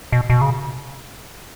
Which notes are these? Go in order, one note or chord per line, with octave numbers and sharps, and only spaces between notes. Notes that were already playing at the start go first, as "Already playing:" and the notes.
B2
B2
C#3